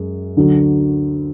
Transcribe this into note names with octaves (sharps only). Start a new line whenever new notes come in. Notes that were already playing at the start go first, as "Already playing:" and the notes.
Already playing: F#2 G#3
D2 D3 F#3